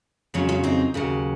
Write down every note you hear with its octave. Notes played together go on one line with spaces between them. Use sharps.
F2 C#3 F#3 C#4 F4
C#4 F4
C4 D#4
D#2 C#3 F#3